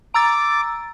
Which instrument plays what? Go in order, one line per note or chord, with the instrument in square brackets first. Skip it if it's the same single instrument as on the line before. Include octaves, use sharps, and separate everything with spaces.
[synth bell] A#5 E6 A6 [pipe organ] D6